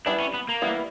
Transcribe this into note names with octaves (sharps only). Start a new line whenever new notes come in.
E3 G3 B3 D4 E4
C#4
B3
A#3
E3 G3 B3 E4